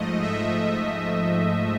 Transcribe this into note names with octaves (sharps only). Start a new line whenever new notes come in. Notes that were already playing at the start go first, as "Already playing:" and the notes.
Already playing: G#2 F3 A3 D#5
E5